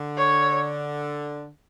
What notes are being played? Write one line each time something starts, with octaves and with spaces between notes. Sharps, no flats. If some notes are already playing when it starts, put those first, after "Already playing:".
Already playing: D3
C#5